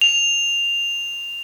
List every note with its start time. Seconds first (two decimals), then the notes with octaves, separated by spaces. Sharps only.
0.01 F7